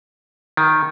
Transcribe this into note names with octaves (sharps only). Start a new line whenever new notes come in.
D#3